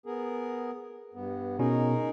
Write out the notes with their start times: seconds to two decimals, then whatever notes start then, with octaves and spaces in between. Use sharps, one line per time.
0.06 B3 G#4 A#4
1.14 G2 B3
1.59 B2 C#4 D#4 G#4 A#4